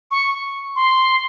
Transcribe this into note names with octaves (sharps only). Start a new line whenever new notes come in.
C#6
C6